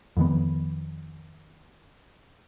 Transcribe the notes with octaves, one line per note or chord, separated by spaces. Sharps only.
F2 D#3 B3